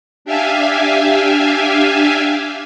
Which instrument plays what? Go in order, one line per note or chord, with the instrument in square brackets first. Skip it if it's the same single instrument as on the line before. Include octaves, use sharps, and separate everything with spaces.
[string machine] D4 G4 E5 F5 G#5